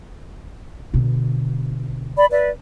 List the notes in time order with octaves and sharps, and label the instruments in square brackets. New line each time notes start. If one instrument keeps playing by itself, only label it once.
[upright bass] B2 D3
[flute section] D5 B5
B4 D5 E5